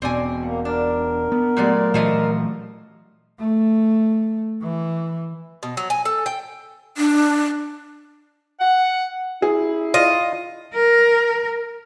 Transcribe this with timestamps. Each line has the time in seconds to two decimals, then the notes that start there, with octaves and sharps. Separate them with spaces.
0.02 E1 B2 C4 C#4 D5 G#5
0.43 A#3 F#5
0.65 D4 A#4
1.32 B3
1.57 A#2 F#3 G#3 A3 G4 D5
1.94 A#2 E3 F3 A3 C#4 D5 D#5
3.40 A3
4.62 E3
5.63 B2
5.77 F#3
5.90 G#5
6.05 A4
6.26 G5
6.97 D4
8.60 F#5
9.42 E4 G#4
9.94 F4 D#5
10.74 A#4